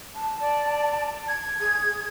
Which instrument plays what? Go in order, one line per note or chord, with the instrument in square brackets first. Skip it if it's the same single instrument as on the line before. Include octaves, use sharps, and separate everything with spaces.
[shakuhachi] A5
[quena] D5
G#6
[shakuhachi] G#4